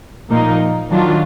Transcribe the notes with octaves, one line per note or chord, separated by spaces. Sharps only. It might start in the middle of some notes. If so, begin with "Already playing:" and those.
A#2 F3 A#3 D#4
D#3 F#3 D4 F4